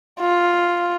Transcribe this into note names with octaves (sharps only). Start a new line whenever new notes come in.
F4